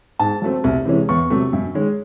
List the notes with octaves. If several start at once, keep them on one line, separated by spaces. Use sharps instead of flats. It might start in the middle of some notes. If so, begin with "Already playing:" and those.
G#2 A5
F#3 A3 C4
C2
C3 E3 G#3 C#4
E2 C#6
C3 F#3 A3
F#2
D#3 G#3 C#4